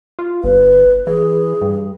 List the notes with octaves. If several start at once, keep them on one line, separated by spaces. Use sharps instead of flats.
F4
G1 B4
E3 G#4
G2